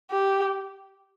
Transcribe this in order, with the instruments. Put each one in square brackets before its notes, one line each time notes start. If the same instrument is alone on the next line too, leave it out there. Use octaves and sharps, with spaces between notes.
[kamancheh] G4